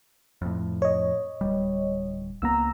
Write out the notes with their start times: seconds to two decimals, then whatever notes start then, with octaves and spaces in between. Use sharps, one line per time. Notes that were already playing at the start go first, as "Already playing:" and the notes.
0.42 F2 A2
0.82 C#5 D#5
1.41 D1 G3
2.42 C#2 A#3 B3 A#5 E6